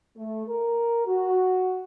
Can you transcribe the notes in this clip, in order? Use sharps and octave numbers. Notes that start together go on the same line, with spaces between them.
A3
A#4
F#4